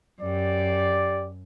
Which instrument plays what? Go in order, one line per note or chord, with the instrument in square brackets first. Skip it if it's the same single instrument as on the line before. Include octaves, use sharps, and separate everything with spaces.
[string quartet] F#2 [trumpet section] G4 D5